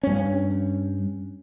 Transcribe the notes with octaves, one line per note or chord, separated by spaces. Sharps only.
G2 C#4